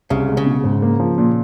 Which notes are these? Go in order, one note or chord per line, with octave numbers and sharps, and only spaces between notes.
C2 C#3
G#3
C#3
B2
G#2
A#3
F3
A#2